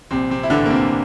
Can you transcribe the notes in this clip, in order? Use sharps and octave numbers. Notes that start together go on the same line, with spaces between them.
A#1 C3 C4
C3 C4
E4
A2 D3 E3 D4
A#3
C3 C4